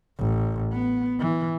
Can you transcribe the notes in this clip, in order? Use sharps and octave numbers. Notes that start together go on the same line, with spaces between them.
A1
B3
E3